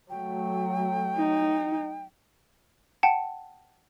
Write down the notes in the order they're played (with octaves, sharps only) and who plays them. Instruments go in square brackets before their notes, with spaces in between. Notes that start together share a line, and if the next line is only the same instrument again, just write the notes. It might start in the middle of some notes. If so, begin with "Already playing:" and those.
[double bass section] F#3 A3 [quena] G5
[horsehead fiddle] D#4
[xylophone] F#5 G5 A5